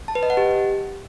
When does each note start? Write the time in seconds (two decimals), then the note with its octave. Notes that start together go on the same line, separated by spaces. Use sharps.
0.08 A5
0.15 B4
0.23 D#5
0.30 F#5
0.37 G4